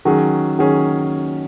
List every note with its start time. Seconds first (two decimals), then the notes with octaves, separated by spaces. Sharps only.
0.05 D#3 F#3 C#4 G#4
0.59 D#3 F#3 C#4 G#4